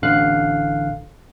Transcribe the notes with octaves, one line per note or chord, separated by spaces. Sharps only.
A1 D3 F5 F#6